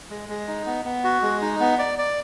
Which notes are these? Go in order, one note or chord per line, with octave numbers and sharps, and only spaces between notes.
G#3
G#3
D#4
B3
B3
F#4
G#3
D#4
B3
D5
D5